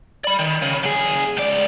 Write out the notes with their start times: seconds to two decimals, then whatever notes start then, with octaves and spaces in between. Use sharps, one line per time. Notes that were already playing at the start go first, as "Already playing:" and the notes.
0.24 D5 B5
0.39 D#3
0.62 C#3
0.83 F#2 G#4
1.37 C#2 D5